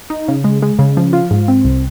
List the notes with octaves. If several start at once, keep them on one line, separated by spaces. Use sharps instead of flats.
D#4
C#3
G#3
G#3
C#3
F3
F4
G#2
C4
C2